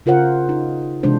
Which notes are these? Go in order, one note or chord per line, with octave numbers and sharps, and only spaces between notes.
C#3 F4 A#4 C5 F#5
D#4
C3 E3 G#3 D4 C5